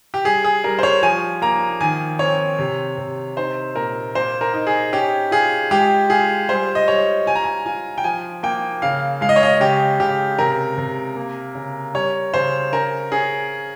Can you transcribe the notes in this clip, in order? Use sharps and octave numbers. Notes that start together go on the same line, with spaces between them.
G4
G3 G#4
G#4
G3 A#4
C5
C#5
F3 G#5
A#3 A#5
D#3 G#5
C4 C#5
C3
C3
D#4 C5
A#2 A#4
A#3 C5
A#4
D#4
G#4
C#4 G4
F4 G#4
G#3 G4
F4 G#4
G3 C5
D#5
G3 C#5
F4 G#5
A#5
G#5
F4 G#5
G5
F3 G#5
A#3 G5
C#3 F5
G#3 F5
D#5
C#5
D#5
C#3 G4
C#3 G4
C3 A#4
C3
A#3
C#3
G3 C#5
C#3 C5
C#4 A#4
C#4 G#4